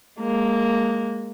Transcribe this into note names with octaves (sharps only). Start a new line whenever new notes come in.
G#3 A#3